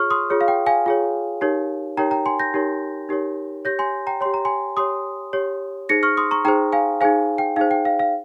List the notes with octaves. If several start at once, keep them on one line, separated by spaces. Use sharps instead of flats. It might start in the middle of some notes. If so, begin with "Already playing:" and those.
Already playing: F4 G#4 C#5 C#6 F6
C6 D#6
F4 G#4 C#5
F5
G5
F5 G#5
F4 G#4 C#5
D#4 G4 A#4 C#5
D#4 G4 A#4 C#5 G5 A#5
G5 A#5
G#5 C6
G6 A#6
D#4 G4 A#4 C#5
D#4 G4 A#4 C#5
G4 C#5 G6 A#6
G#5 C6
G5 A#5
G4 C#5 C6
A#5
G#5 C6
G4 C#5 C6 D#6
G4 C#5
D#4 G#4 C5 A#6 C#7
C#6 F6
C6 D#6
A#5 C#6
D#4 G#4 C5 G5 A#5
F5 G#5
D#4 G#4 C5 F5 G#5
G5
D#4 G#4 C5 F5
G5
F5
F5